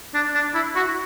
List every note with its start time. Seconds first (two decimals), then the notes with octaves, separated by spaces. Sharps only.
0.14 D4
0.35 D4
0.54 E4
0.75 F#4